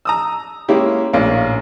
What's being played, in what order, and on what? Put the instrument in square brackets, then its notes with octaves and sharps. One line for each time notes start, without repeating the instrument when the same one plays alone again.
[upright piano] A#5 D#6 E6
G#3 A#3 C#4 E4 G4
A#1 A2 A#3 C#4 F5